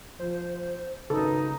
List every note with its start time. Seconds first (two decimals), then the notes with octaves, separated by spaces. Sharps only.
0.19 F3 C5
1.10 G#1 F#2 C#3 D#4 A4 B4